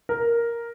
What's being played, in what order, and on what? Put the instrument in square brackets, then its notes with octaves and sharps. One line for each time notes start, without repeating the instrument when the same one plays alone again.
[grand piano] A#4